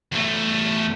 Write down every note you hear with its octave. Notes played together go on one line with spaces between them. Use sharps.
E2 A3